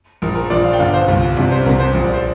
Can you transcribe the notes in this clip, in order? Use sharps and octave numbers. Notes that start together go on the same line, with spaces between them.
A#1 A#2 A#4
A#4
A#1 A#2 D5
F5
G5
G1 G2 D3 F5
C5
C2 A#2
C2 C3 D5
C5
C2 C3 A#4
C5
A#1 A#2
D5
C5